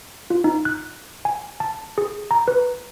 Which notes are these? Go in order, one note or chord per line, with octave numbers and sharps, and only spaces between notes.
F4
D#4
F#6
G#5
A5
G#4
A#5
B4